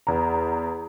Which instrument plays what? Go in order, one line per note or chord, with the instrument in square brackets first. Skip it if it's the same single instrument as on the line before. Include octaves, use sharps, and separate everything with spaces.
[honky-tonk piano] E2 A#5